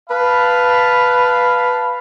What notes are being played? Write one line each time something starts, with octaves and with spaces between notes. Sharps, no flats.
B4 F5 A5 B5